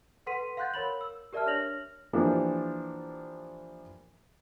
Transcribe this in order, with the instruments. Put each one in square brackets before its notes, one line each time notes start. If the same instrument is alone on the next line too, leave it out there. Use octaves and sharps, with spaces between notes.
[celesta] A4 B4 F#5 C6 B6 D#7
F5 F#5 C6 F#6 G6 A6
A#4 C#5 B5 F#7
E6
G4 A#4 D5 E5 A5 F6
D4 C#5 F6 A#6 F7 F#7
[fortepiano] E3 F3 A#3 D4 G4